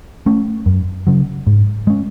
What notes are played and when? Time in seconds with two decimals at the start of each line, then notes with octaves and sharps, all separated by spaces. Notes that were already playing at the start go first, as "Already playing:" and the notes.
0.26 A3 C#4
0.66 F#2
1.07 C#3 F#3
1.47 G#2
1.87 G#3 C#4